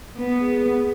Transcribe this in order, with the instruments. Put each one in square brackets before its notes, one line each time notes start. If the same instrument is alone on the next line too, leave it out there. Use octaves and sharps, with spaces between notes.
[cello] B3 [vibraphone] B4
[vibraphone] G#4
B4